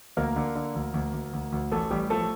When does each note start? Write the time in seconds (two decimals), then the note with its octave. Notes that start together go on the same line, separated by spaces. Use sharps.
0.17 D2 A#3 A#4
0.36 D3
0.55 D3
0.75 D2
0.94 D2
1.13 D2
1.33 D2
1.52 D2
1.72 A1 A3 A4
1.91 A1 G3 G4
2.10 F3 A3 A4